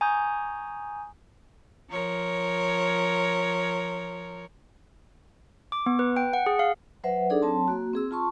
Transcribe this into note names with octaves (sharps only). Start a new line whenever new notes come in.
G#5 A#5 C#6 D#6 G6
F3 A#4 C#5
D6
B3
B4
G5
F#5
G#4
F5
F#3 B4 C5 E5 F#5
D4 D#4 G#4 A4 D5
F#3 C4 C#5 A5 C6
A#3 F#4
C4 G#4 E6
F4 A5 C6 C#6